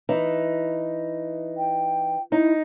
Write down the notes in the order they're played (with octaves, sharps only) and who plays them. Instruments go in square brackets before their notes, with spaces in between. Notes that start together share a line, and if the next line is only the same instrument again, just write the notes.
[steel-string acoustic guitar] E3 D#4
[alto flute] G5
[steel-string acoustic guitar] D#4 [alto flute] E4